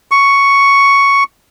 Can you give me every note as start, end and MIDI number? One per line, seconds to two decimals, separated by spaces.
0.11 1.24 85